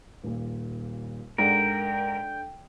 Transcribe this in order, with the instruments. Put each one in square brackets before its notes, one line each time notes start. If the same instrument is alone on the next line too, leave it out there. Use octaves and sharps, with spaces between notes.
[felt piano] D#1 A#2
[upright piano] G#2 F#5 [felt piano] D4 A4 D5 [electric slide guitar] A#4 [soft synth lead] G5